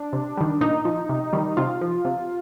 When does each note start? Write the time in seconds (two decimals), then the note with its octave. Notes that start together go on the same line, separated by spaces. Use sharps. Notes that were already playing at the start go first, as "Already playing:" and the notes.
Already playing: D4
0.13 C3
0.37 D#3 G3
0.61 A#2 D#4
0.85 F3
1.09 C3
1.33 D#3 G3
1.57 C3 F4
1.81 F3
2.05 C3